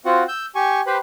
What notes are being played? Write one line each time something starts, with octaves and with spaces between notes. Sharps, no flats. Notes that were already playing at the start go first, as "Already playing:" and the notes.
C4 F4 F#4 F#5
E6 G6
G4 G#5 C#6
G4 B4 C5 B5